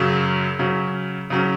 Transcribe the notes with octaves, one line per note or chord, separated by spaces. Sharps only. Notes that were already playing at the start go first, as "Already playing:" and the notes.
Already playing: F#2 C#3 F#3 C#4
C#3 F#3 C#4
C#3 F#3 C#4